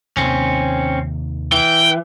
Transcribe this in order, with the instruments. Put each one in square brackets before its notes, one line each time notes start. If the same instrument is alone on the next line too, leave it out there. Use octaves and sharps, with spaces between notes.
[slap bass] D#2 C3 D#3 [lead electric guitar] C4 C#4
[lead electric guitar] E3 [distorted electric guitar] G5